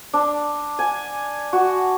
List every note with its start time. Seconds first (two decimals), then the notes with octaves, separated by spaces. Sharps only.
0.13 D4
0.79 G#5
1.53 F#4